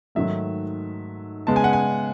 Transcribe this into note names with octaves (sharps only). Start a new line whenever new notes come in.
G#2 D#3 F#3 A3 E5
C#3 G#3 B3 A5
G#5
F#5
G#5